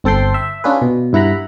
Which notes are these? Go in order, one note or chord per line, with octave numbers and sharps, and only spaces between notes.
G1 C4 A4 G5 C6
E5
C#4 D4 F4 G#4 B4
B2
G2 E4 F#5 A#5 B5